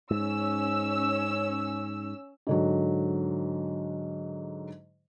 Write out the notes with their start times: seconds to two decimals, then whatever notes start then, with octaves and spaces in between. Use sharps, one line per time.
0.11 G#2 C#4 E6
2.47 G#2 D3 F#3